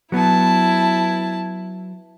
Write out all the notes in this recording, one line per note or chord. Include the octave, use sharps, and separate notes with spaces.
F#3 B3 E4 A5